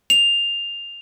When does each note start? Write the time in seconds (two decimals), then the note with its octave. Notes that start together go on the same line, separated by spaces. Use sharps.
0.10 F7